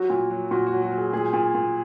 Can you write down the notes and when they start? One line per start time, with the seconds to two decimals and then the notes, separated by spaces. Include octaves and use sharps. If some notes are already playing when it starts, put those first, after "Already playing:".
Already playing: F#3 F#4
0.10 A#2
0.31 F#3
0.51 A#2 F#4
0.67 F#4
0.72 F#3
0.82 F#4
0.92 F#3
0.98 G#4
1.13 A#2 G#4
1.33 A#2
1.55 A#2